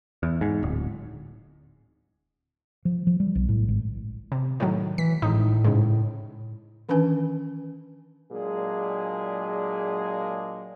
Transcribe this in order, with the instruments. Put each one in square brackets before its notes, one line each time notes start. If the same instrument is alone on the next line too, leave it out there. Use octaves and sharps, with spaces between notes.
[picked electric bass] E2
G#2
D1
[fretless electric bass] F3
F3
G3
B1
A2
G#1
[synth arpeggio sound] C3
A2 D#3 F#3
[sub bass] E3 [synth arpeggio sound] B6
[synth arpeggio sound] G#1 D#4 [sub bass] A2
[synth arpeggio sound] G#2 C#3
[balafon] D#3 E3 C#4 D4 B4 G#5
[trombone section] A#2 F#3 G#3 D4 G#4